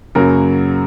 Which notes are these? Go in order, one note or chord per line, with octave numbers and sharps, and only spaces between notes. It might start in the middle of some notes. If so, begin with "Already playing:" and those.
F#2 C#3 F#3 A#3 A#4